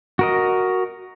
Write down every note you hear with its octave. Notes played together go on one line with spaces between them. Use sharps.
F#4 A#4 D#5